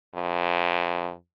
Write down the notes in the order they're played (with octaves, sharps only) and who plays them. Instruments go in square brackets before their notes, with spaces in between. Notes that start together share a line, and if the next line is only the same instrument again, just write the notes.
[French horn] F2